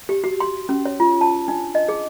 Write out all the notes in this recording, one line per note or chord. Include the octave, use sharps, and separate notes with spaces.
G4
F#4
C6
C#4
C#5
F4
A5
D4
D#5
G#4